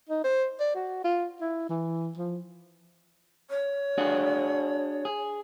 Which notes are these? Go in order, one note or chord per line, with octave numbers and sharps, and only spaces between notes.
D#4
C5
D5
F#4
F4
E4
E3
F3
C#5
D4 F#4 G#4
G#4